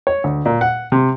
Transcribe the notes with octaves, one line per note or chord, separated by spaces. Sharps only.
C#5
D2
A#2
F#5
C3